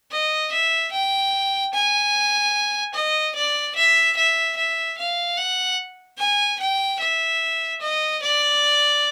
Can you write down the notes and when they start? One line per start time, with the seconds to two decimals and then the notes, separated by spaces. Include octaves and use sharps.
0.11 D#5
0.52 E5
0.92 G5
1.73 G#5
2.94 D#5
3.35 D5
3.75 E5
4.17 E5
4.56 E5
4.98 F5
5.37 F#5
6.18 G#5
6.59 G5
7.00 E5
7.81 D#5
8.22 D5